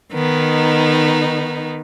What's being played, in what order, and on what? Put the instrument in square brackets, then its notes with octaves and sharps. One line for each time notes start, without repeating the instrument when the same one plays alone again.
[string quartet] D#3 B3 D#4